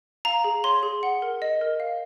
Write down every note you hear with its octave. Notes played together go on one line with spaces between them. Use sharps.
F5 A#5
G#4
C#5 C6
G#4
F#5
A#4
D#5
A#4
F5